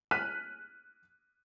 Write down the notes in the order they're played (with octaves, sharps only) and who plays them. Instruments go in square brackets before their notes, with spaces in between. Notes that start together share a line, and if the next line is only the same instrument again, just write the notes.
[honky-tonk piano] F6 F#6 B6 D#7